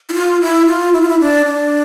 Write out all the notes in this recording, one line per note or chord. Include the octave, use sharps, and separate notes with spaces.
E4
F4
E4
F4
E4
F4
E4
D4
D4